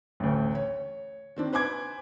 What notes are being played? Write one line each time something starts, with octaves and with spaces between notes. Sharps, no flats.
A1 D2
C#5
D#3 C4 D4
B4 C5 G#5 D6 G#6